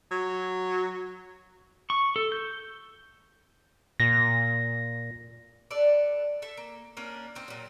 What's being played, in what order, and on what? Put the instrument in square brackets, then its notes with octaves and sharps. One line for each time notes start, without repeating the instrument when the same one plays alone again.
[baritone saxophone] F#3
[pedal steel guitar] C#6
A4
G6
[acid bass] A#2 [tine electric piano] A#6
[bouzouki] D4 A4 B4 D5
A4 E5
A#3
A#3 C#4 D4 A#4
A#3 C4 D#4
A#2 F#3